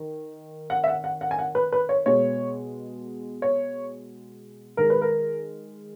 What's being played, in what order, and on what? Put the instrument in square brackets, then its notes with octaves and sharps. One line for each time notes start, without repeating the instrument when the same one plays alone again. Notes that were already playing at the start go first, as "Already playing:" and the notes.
Already playing: [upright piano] D#3
F#5
E5
F#5
F#5
F#5
G#5
F#5
B4
B4
C#5
B2 G#3 C#5
C#5
D#3 G#3 A#4
B4
A#4